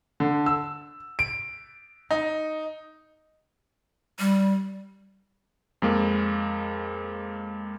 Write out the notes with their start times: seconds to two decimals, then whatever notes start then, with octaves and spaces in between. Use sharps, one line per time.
0.20 D3
0.46 E6
1.19 D7
2.11 D#4
4.20 G3
5.82 F2 G#3 A#3